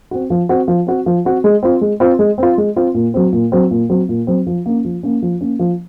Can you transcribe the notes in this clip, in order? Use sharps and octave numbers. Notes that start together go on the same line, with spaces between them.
C4 F#4
F3
C4 F#4
F3
C4 F#4
F3
C4 F#4
G#3
C4 F4
G#3
C4 F4
G#3
C4 F4
G#3
C4 F4
A#2
F#3 C4
A#2
F#3 C4
A#2
F#3 C4
A#2
F#3 C4
F3
A#3 C#4
F3
A#3 C#4
F3
A#3 C#4
F3